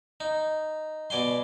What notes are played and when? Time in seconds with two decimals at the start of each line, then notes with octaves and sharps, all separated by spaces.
0.20 D#4
1.10 B2 D5 G#5 C6